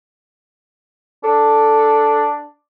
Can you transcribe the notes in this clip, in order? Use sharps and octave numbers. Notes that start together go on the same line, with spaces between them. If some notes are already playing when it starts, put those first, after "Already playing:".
D4 A4